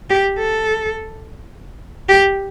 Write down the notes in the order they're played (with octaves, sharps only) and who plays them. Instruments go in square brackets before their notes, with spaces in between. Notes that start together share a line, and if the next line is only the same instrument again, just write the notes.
[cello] G4
A4
G4